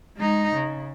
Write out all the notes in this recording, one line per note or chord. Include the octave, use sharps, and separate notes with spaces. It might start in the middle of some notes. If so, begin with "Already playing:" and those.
G#3 D#4
C#3